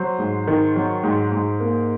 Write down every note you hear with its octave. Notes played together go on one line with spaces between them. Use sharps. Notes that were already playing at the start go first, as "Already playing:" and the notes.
Already playing: F#3 C5
G#2
D#3
F#3
G#2
G#2
A#3